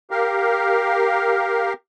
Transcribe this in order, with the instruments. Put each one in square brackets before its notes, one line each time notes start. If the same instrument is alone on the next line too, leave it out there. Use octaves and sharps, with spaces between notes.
[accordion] G4 A#4 F5